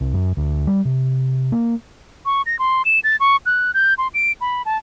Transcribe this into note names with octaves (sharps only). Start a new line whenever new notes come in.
C2
F#2
D2
G3
C3
A#3
C#6
A#6
C6
E7
A6
C#6
F#6
G6
C6
D7
B5
A5